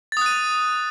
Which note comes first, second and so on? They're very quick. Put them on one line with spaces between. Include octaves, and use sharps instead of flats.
A6 D#6 F#6 D#7